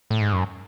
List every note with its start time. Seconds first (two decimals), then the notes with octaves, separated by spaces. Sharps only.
0.10 A2
0.21 G#2
0.33 F#2